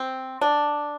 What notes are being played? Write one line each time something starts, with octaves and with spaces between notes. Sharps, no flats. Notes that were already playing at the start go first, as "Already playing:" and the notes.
Already playing: C4
D4